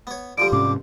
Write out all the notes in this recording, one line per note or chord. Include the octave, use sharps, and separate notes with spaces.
B3 C#5
D3 F3 G3 D7
G#2 C3 C#4 D6